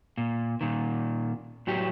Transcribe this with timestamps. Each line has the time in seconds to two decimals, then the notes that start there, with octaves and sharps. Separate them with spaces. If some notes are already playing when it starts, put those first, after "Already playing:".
0.18 A#2
0.61 A#2 D#3
1.67 A2 F#3 G4